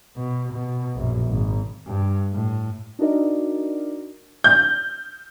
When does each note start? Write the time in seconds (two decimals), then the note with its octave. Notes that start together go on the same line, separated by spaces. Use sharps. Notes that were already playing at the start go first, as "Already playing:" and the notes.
0.17 B2
0.53 B2
0.95 A#1 F#2
1.27 G#1
1.86 G2
2.33 A2
2.99 D4 D#4 F#4 A#4 D5 D#5
4.44 G6